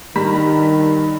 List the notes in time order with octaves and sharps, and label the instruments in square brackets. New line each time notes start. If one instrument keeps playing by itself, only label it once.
[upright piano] G2 A#5 B6 [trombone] D#3